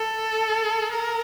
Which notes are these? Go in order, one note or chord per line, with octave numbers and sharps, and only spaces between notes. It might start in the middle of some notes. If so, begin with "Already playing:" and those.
Already playing: A4
A#4